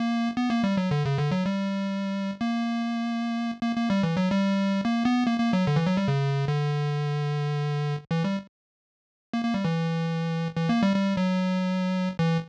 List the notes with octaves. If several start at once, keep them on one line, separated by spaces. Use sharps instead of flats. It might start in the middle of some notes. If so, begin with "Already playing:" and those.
Already playing: A#3
B3
A#3
G3
F#3
D3
C#3
D3
F#3
G3
A#3
A#3
A#3
G3
E3
F#3
G3
A#3
B3
A#3
A#3
F#3
D3
E3
F#3
G3
C#3
D3
E3
G3
A#3
A#3
G3
E3
E3
A#3
G3
G3
F#3
E3